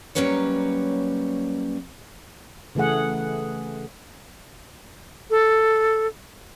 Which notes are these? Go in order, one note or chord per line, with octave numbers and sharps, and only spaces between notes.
F#3 G3 A#3 C#4 B4 C#5
C#3 E3 A3 G#4 F#5
A4